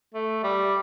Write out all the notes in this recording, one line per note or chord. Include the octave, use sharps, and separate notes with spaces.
A3
G3